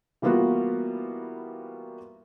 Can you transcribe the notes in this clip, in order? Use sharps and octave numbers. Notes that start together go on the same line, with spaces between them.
E3 G3 A#3 B3 F4 F#4